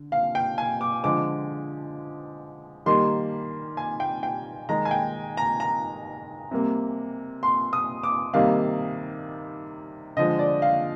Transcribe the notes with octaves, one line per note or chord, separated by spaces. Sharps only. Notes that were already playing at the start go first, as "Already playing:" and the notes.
Already playing: D3
F5
G5
G#5
D6
D3 F3 G#3 D6
D#3 G3 A#3 C6
G#5
G5
G5
D#3 G#3 A#5
G#5
G5
A#5
A#5
C3 G3 A#3
C6
D#6
D6
C3 D#3 G3 A#3 F5
D3 F3 G#3 D#5
D5
F5